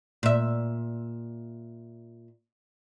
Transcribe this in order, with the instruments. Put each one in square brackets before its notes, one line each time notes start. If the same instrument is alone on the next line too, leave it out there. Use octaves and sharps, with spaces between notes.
[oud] A#2 E5